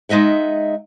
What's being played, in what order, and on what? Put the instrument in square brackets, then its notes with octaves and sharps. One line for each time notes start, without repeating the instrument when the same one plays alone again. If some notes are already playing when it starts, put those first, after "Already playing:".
[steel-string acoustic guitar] G#3 D#4 D#5 E5 F#5